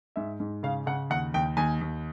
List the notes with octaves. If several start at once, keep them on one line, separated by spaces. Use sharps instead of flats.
G#2 E5
G#2
C#3 F5
C#3 F#5
D#2 F#5
D#2 G5
D#2 G#5
D#2